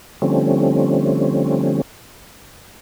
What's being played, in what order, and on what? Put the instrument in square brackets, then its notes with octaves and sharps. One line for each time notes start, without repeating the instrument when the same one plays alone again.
[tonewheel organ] D3 F3 G3 A3 C4 C#4